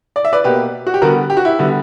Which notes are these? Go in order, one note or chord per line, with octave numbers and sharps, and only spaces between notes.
D5
E5
B4 D5
B2 A#3 G4 B4
F#4
G4
D3 G3 B3 F#4 A#4
G4
F#4
E4 G4
D3 G3 B3